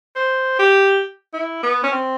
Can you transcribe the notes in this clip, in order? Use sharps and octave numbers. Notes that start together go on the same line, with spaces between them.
C5
G4
E4
B3
C#4
C4